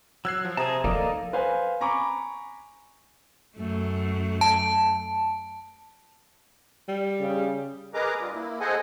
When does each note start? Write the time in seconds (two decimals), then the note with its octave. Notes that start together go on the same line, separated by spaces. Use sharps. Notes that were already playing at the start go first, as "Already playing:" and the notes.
0.25 F#3 E6 F#6 G#6 C7
0.45 F3
0.57 C3 G#4 A5 A#5 D#6
0.84 F3 A#3 D#4 A4 D5
1.33 B4 C5 F5 G#5
1.81 G#5 A#5 B5 C#6 D6
3.57 F#2 A3
4.41 A5
6.89 G3
7.20 C#3
7.94 G#4 A#4 B4 D#5 A#5 D6
8.21 G2 G3 F4
8.34 A#3 E4
8.60 G#4 A4 C5 D#5 F#5 G#5